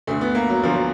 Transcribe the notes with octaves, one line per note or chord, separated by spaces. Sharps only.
D2 D3 A3
B3
A#3
F#3
D2 D3 F3
F#3